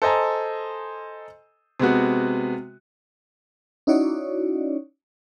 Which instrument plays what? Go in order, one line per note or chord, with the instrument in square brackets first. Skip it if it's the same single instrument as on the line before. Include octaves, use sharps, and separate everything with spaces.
[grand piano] A4 C5 D#5 G#5 A#5
C3 G#3 B3 F#4
[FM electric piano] C#4 D#4 E4 F#4 C#5 D5